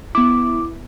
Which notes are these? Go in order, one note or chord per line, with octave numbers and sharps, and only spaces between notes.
B3 E4 D6